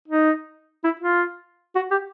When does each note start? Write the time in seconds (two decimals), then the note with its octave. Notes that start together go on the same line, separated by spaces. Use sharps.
0.08 D#4
0.84 E4
1.00 F4
1.75 F#4
1.91 G4